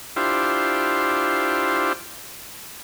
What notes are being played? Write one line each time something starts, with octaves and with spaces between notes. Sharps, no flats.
D4 E4 F4 G4 C5